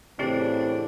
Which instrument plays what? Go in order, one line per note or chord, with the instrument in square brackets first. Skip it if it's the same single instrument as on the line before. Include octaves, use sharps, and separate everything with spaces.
[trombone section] A2 C#3 E3 [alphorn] C4 [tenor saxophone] D4 [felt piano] G4 A6 C7